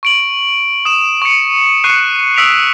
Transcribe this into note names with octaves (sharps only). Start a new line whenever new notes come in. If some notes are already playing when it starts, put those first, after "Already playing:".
C#6 D7 F#7
D#6 E7
C#6 C#7
C#6 F#6 C7 C#7 D#7
D#6 E6 B6 D7 F7